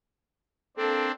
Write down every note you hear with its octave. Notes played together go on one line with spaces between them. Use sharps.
A#3 C4 D4 A4